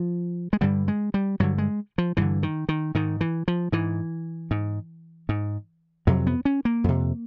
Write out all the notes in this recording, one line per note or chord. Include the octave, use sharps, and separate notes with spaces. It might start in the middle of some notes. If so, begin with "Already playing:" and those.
Already playing: F3
G#3
G2 D3 G3
G#3
G3
G2 D3 F#3
G#3
F3
G2 D3 E3
D#3
D#3
G#2 D#3
E3
F3
G#2 E3
G#2
G#2
F2 C3 F#3
B3
C#4
A#3
F2 C3